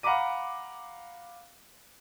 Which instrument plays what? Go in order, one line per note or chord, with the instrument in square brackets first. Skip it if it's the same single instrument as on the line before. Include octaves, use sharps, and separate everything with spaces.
[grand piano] F5 F#5 A#5 B5 D6 D#7